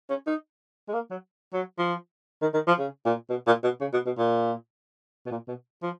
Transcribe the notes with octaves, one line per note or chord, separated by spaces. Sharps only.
C#4
D#4
G#3
A#3
F#3
F#3
F3
D#3
D#3
F3
C#3
A#2
B2
A#2
B2
C#3
B2
B2
A#2
B2
A#2
B2
F3